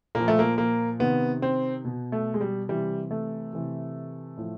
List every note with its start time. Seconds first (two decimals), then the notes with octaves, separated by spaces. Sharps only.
0.15 A#2 F3 A#3
0.28 A3
0.39 A#3
0.58 A#3
0.99 C3 D#3 B3
1.42 C4
1.85 B2
2.12 A3
2.34 G#3
2.41 G3
2.69 C3 E3 G3
3.11 A3
3.53 C3 E3
4.37 A2 F3